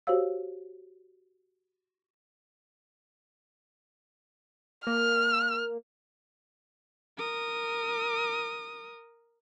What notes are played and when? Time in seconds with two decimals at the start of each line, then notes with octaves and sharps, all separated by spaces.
0.07 F#4 G4 C5 C#5 F5 E6
4.87 A#3 F6
7.18 A#4 D#6